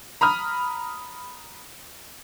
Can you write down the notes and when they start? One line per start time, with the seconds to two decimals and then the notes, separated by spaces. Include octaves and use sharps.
0.21 A#5 B5 D#6 F6